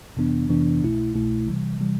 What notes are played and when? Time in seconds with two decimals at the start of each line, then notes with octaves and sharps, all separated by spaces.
0.17 F2 C3 E3 B3 D4
0.49 F2 C3 E3 B3 D4
0.82 C2 B2 A3 E4
1.14 C2 B2 A3 E4
1.47 C3 E3 G3
1.79 C3 E3 G3